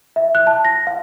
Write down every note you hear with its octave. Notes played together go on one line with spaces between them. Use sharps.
E5
F#6
A5
A#6
F5